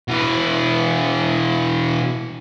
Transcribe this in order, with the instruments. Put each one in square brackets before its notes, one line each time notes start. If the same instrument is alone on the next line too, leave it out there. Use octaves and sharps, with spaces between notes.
[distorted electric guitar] B2 E3